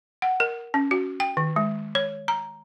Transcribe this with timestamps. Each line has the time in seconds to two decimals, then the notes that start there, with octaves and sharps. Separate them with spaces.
0.22 F#5
0.40 A#4
0.74 C#4
0.91 F#4
1.20 G5
1.37 D#3
1.56 G#3
1.95 C#5
2.28 A#5